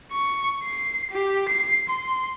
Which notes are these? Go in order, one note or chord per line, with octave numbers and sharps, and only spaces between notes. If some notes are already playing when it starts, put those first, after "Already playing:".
C#6
C7
G4
C7
C6